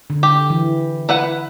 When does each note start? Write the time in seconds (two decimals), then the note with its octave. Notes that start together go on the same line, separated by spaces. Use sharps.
0.10 D3
0.23 G4
0.50 E3
1.09 E4 B4 F#5